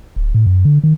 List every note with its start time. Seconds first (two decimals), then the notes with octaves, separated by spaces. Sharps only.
0.16 D1
0.34 A2
0.46 F#2
0.65 D3
0.84 D#3